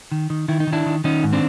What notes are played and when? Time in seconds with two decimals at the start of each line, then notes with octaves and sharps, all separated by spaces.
0.12 D#3
0.30 D#3
0.48 D#3 E4
0.60 D#4
0.67 D#3
0.73 D4 E4
0.86 D#3
1.04 D#3 C#4 D#4
1.23 G#2
1.33 C4 D4